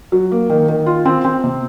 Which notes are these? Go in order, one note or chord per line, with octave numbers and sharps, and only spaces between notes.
F#3
A#3
D#3
D#3
F4
C4
C4
C3